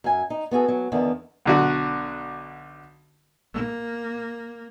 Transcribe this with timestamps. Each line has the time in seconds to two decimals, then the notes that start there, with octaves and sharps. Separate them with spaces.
0.04 F#2 G#5
0.30 D#4
0.51 B3 F#4 G#4 A4
0.68 F#3
0.92 E2 D3 D#3 B3
1.45 B1 D3 F#4
3.54 A#3